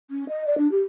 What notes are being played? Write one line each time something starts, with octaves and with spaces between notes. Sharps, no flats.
C#4
D#5
D5
D4
G4